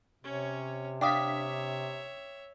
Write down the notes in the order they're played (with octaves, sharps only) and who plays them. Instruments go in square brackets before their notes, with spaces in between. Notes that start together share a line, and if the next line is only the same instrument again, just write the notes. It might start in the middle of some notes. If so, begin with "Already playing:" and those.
[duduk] C3 [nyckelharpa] C#4 C#5
[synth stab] D4 F5 B6 [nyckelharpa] C#5 E5 [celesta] G5 D6 D#6